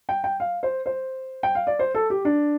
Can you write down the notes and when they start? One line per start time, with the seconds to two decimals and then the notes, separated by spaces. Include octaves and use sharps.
0.09 G5
0.24 G5
0.40 F5
0.63 C5
0.86 C5
1.43 G5
1.55 F5
1.67 D5
1.79 C5
1.95 A4
2.10 G4
2.25 D4